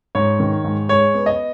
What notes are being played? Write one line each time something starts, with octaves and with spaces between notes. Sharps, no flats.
G#2 C#5
D#3
G#2
G#3 C#5
B3
D#5